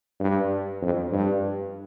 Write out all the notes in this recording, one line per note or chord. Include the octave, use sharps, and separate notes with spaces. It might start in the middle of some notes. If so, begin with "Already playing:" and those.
G2
F2
G2